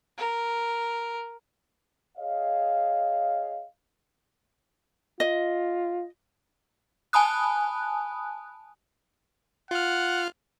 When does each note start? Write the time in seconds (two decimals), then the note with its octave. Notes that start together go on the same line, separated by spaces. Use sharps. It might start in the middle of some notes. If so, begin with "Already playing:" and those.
0.17 A#4
2.17 G#4 C#5 D#5 F5
5.20 F4 D#5
7.13 G#5 A5 B5 D#6 F#6
9.71 F4 F#5 F6